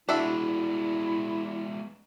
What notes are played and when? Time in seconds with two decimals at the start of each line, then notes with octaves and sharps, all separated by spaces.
0.09 G#3 B3 D4 E4 F#4 E5